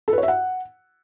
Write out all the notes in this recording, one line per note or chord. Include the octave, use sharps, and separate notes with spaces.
A4
B4
C#5
E5
F#5